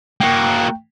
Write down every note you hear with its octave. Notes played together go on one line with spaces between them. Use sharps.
A#3 F#4 G5